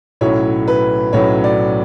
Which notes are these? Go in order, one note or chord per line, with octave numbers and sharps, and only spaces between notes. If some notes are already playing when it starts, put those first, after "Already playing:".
B1 A2 F#3 C#4 E4 C#5
B4
B1 A2 F#3 C#4 E4 C#5
D5